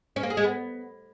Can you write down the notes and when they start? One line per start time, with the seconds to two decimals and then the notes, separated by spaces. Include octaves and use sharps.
0.16 C#4
0.23 A#3
0.30 G#4
0.37 G#3
0.44 B3